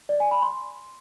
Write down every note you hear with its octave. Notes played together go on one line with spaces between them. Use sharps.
D5
G#5
B5
C6